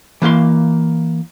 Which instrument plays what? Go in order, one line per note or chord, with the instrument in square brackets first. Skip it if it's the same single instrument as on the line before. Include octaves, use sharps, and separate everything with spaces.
[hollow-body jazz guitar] E3 A#3 F5 C6